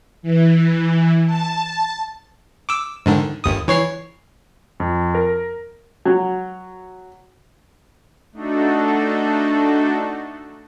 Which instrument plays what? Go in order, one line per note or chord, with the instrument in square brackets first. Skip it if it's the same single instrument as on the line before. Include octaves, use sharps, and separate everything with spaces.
[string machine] E3
A5
[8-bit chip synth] D6 E6
G#2 D3 D#3
G1 D#2 D#6
E3 C#5 C7
[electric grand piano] F2
A#4
[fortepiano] F#3
[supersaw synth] A3 D4 D#4 F#4 A4